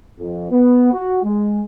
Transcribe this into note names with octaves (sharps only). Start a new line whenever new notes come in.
F2
B3
F#4
G#3